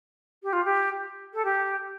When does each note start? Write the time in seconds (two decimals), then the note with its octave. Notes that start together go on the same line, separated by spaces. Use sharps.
0.43 G4
0.53 F4
0.65 G4
1.34 A4
1.45 G4